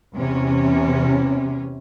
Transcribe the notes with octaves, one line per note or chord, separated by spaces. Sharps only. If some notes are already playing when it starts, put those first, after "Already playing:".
E2 C3 C#4